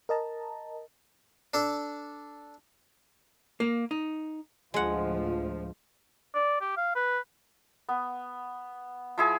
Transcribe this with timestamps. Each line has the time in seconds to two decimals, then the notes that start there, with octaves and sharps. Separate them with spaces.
0.09 A#4 D#5 A5 A#5
1.54 D4 A4
3.60 A#3
3.91 D#4
4.74 D2 A2 F3 G#3 F#5
6.35 D5
6.61 G4
6.77 F5
6.95 B4
7.89 B3
9.18 F3 E4 G#4